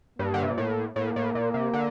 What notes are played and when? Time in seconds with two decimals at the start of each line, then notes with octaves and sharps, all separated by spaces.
0.19 G2 A#3
0.34 D3
0.42 C3
0.50 A#2
0.58 A2
0.96 A2 A#3
1.16 A2
1.35 A#2
1.54 C3
1.73 D3